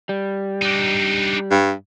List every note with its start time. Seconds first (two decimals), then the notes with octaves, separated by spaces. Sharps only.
0.09 G3
0.62 D4 D#4
1.51 G2